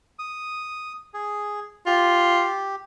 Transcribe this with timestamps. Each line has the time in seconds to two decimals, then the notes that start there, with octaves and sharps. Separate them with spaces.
0.19 D#6
1.14 G#4
1.86 F4 G4